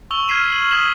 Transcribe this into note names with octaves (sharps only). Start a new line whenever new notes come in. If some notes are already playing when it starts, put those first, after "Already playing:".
C#6 E6 F7 G7
F6 G#6 B6 C7 D#7 E7
F#7
C#6 D#6 G#6 B6 E7 F#7